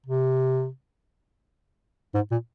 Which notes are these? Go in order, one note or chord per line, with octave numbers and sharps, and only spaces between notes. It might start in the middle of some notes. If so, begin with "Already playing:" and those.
C3
G#2
A#2